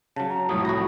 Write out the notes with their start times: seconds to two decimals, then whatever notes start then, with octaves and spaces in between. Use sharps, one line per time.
0.16 C#3 F#3 A5
0.30 A#5
0.49 C2 F2 A2 F#3 D#6
0.65 F#4 A#5 B5